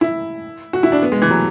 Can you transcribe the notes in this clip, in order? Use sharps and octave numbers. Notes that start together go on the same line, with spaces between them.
E4
F#4
E4
D4
B3
G#3
E3
F#3